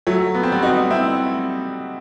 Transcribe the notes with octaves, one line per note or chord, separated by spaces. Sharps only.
F#3 A3
B3
C4
G3 B3
D#4 F#4
C4 E4